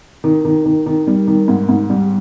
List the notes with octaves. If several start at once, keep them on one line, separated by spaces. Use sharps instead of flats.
D#3
D#3
D#3
D#3
G3
D#3
G#2
G#2
G3